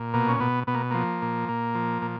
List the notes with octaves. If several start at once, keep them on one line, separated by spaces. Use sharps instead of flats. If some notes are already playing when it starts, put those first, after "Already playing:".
Already playing: A#2
B2 A#3
C#4
B2 B3
B2 B3
A#3
F3 A#3
A#2
A#2
F3
A#2